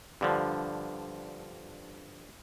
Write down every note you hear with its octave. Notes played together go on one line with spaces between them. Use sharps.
G2 D3 F3